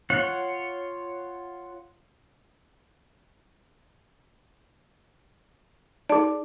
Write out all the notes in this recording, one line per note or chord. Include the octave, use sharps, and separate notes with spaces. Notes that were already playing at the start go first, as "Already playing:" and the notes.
F4 C#5 F#5
D#4 G#4 D5